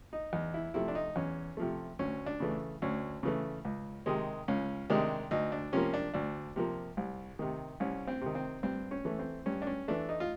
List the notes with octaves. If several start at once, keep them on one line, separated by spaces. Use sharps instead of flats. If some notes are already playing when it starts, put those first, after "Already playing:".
D#4
E2 D#4
E4
C3 F3 A3 E4
D4
D#4
E2 C#4
C3 F3 A3
D2 C#4
D4
C#3 E3 A3
D2 C#4
C#3 E3 A3
C#2
C3 D#3 G#3
C#2 C#4
C3 D#3 G#3 D4
D2 D#4
D4
C3 F3 A#3 C#4
D4
D2 D4
C3 F3 A#3
C2
C3 D#3
C2 C#4
C4
C3 D#3
C4
G2 C4
C#4
E3 A3
C4
G2 C#4
D4
C#4
E3 A3 D4
D#4
F4